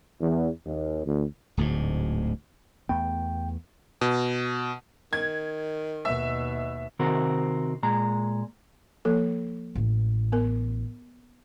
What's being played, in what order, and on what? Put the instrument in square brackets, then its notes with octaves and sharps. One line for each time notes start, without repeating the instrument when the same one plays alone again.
[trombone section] E2
D#2
D2
[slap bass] D1 D2 G#2
[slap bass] E2 A3 B3 [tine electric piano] G5
[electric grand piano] B2
[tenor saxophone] D#3 [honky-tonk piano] G#6
[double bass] D#2 B2 [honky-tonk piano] E5
[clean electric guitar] C3 D#3 C4 F#4 A#4
A#2 G#3 A#5
[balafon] F3 A#3 A4
[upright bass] A1 E3
[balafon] B3 A#4